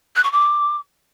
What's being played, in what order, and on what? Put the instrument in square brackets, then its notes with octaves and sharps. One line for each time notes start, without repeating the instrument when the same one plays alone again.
[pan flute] F#6
C#6
D6